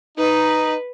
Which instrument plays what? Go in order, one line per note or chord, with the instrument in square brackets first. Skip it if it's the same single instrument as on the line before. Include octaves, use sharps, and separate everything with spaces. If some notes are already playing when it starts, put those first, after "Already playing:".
[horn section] D#4 [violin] B4